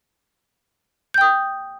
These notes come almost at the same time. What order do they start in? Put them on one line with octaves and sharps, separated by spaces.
G6 G5 D#6